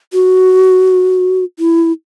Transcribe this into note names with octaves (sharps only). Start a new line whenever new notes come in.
F#4
E4